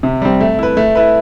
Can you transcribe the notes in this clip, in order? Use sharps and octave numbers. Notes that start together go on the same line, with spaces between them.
C3
G3 C4
A3
E4 B4
A3
E4 B4